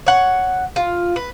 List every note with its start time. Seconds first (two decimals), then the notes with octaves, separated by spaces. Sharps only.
0.06 C#5 F#5
0.76 F4
1.16 B4